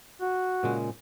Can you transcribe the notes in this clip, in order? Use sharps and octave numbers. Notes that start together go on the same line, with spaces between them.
F#4
A#2 C#3 G#3